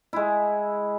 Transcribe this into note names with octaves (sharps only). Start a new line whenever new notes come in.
G#3 E4